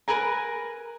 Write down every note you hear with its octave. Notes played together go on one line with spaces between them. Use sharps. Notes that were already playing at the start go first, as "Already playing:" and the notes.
A#4 B4 G#5 A#5